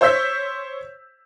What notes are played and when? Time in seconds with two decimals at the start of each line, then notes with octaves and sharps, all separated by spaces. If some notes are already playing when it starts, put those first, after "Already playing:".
0.01 C5 C#5 E6 G6 B6